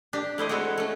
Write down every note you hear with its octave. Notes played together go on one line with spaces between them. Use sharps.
D4 G4
A3 E4 C5 D#5
G#3 C4 F#4 A4 C#5
A3 C#4